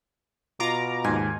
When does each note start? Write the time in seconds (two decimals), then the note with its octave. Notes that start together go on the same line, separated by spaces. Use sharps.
0.60 B2 F4 A#5 D6
1.04 D#2 G#2 G#5